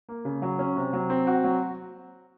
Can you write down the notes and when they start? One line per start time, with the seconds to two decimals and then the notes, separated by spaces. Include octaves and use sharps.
0.09 A#3
0.25 C#3
0.42 F#3
0.59 C#4
0.76 C3
0.93 F#3
1.10 C4
1.27 F#4
1.44 F#3